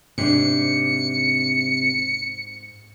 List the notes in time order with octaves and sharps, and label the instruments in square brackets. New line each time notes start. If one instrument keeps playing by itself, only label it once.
[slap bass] G#2 [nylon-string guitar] C3 D4 [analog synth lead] C#7